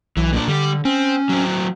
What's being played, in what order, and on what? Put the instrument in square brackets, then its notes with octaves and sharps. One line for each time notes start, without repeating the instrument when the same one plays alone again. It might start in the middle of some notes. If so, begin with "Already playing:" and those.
[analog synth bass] B1 [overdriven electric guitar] E3
[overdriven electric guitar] A#2 D4
[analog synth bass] D3 [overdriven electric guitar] G3 G4
[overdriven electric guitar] C4 [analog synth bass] C#4
[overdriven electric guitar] F#3 C4